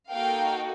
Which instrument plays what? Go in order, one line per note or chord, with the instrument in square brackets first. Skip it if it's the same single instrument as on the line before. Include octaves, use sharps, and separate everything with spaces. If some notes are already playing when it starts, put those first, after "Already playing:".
[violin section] A#3 D#4 F#4 A4 F5 G5